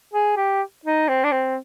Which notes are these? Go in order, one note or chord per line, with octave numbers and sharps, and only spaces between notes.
G#4
G4
D#4
C4
D4
C4